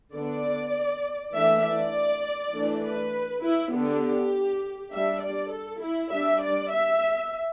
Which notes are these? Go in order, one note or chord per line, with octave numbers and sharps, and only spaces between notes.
D3 B3 D4 D5
E3 A3 D4 E5
D5
E3 A3 D4
B4
E4
D3 B3 D4 G4
G3 D4 E5
D5
A4
E4
G3 D4 E5
D5
E5